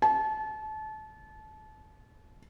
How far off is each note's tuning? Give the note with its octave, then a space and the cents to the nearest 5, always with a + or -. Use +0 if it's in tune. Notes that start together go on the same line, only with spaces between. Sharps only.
A5 -30